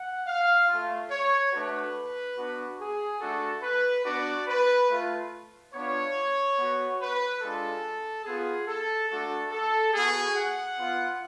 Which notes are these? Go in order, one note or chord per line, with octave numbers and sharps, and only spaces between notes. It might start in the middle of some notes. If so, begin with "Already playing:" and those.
Already playing: F#5
F5
A3 F4
C#5
A3 D4 F#4 B4
B3 D4 F#4
G#4
A3 D4 F#4 A4
B4
B3 D4 F#4 D5
B4
A3 F4
B3 D4 F4 C#5
B3 F#4
B4
G#3 D4 F4 A4
B3 F4 G#4
A4
A3 D4 F#4 A4
A4
B3 F#4 G#4
F#5
B3 F4